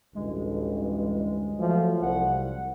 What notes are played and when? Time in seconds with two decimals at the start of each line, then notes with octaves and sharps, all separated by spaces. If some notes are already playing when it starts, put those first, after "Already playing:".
0.15 A1 D2 G2 G#3
1.59 F3 F#3 A3
2.02 C2 F#5